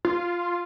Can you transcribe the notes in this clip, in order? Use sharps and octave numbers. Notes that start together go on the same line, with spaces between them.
F4